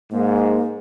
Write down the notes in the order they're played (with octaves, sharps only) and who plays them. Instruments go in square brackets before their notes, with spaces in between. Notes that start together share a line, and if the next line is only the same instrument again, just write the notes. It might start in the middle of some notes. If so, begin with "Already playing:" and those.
[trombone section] G#2 [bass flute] A#3